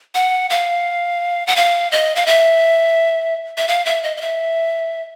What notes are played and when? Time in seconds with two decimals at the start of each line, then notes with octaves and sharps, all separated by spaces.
0.15 F#5
0.50 F5
1.47 F#5
1.56 F5
1.92 D#5
2.16 F5
2.27 E5
3.57 E5
3.68 F5
3.86 E5
4.03 D#5
4.17 D#5
4.21 E5